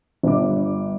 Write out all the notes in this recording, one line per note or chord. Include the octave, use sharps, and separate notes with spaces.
G1 G2 D6